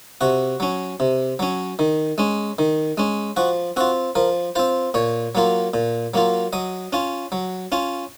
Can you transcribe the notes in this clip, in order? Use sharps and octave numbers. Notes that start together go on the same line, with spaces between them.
C3 F#4
F#3 C#4
C3
F#3 C#4
D#3
G#3 C#4
D#3
G#3 C#4
F3 F#4
C4 F4 F#4
F3 A#4
C4 F4 C5
A#2 C#5
F#3 A#3 F4
A#2
F#3 A#3 F4
F#3 D#5
C#4 F4
F#3
C#4 F4